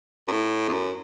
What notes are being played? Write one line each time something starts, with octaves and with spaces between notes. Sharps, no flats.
F#2
A2
E2
F#2